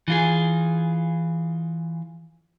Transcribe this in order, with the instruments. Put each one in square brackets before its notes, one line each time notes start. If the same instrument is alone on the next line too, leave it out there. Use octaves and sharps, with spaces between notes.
[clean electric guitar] E3 F4 G#4